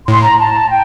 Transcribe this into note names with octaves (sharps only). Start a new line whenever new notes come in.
A2 C6
A#5
A5
G5